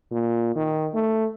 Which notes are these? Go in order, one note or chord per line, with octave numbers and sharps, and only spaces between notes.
A#2
D#3
A3